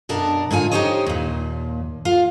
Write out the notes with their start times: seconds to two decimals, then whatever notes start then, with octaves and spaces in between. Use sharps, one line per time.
0.09 F#2 B2 D4 A#4 A5
0.51 G#2 D3 F4 G#5
0.71 D#4 F4 G4 C5 C#5 D#5
1.06 D#2 A#2
2.05 F4 F5